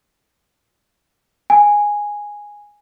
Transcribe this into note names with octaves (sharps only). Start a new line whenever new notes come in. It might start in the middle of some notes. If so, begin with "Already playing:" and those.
G#5